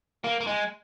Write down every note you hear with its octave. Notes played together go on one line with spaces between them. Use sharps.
A#3
A#3
G#3